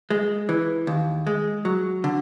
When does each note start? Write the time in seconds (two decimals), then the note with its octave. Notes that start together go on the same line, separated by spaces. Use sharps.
0.10 G#3
0.49 E3
0.87 D#2
1.27 G#3
1.65 F#3
2.04 D3